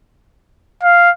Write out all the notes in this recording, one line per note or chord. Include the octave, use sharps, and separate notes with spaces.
F5